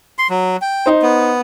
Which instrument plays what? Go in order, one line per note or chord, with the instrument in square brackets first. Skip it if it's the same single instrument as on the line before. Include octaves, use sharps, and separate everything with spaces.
[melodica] C6
F#3
G5
[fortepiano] D#4 C5
[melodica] B3